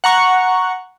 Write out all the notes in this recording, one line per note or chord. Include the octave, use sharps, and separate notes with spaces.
F#5 A#5 C#6